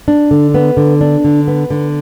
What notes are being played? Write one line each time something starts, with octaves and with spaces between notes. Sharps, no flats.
D4
D3
B3
D3
D4
D3
B3
D3